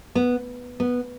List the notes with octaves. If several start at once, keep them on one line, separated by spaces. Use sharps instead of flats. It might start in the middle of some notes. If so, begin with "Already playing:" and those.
B3
B3